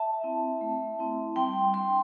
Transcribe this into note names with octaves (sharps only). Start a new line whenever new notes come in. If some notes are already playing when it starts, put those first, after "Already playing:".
Already playing: E5 A5
C4 E4
A3
C4 E4
G3 G5 C6
D4 G5 C6